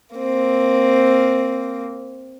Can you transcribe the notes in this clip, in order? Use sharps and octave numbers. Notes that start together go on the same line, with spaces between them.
A#3 C4